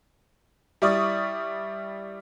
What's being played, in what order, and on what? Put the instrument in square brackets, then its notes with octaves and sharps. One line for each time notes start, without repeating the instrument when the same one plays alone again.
[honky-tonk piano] G3 E4 D5 C#6 D#6